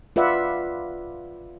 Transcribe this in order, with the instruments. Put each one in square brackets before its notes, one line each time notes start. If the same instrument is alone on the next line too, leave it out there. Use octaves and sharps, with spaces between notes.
[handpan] F4 B4 D5 E5 F#5